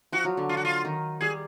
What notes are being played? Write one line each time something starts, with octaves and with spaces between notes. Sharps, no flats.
F3 F#4
F#3
D3
F4
F#4
F4
D#3
G3 G#4